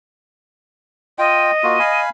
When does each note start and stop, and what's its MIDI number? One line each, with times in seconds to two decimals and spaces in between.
1.19 1.51 65
1.19 2.00 75
1.19 1.51 79
1.63 1.79 58
1.63 1.79 65
1.63 1.79 66
1.79 2.10 77
1.79 2.10 80
1.79 2.10 83